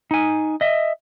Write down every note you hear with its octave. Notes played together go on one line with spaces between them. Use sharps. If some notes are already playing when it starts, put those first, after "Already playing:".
D#4 G#5
D#5 E5